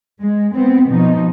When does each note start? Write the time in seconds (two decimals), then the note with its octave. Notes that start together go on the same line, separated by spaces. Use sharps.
0.22 G#3
0.54 B3 C4
0.89 B2 F3 D#4